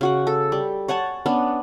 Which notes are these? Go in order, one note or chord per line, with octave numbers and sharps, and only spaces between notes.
C#3 F#4 F#5
A4
G3
C#5 F#5 G#5 A5
B3 C#4 D4